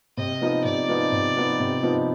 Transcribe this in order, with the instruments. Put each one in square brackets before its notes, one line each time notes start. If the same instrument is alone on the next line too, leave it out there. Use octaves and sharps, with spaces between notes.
[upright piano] C3 [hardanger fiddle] D#5
[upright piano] F3 B3 D#4
[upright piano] C3 [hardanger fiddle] D5
[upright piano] F3 B3 D#4
C3
F3 B3 D#4
C3
F3 B3 D#4